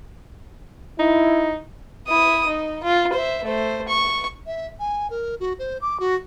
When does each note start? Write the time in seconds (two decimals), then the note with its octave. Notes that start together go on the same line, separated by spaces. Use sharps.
0.99 D#4 E4
2.08 E4 D#6
2.47 D#4
2.83 F4
3.13 C5 E5
3.44 A3 C5
3.88 C#6
4.46 E5
4.79 G#5
5.10 A#4
5.40 F#4
5.59 C5
5.81 D6
6.00 F#4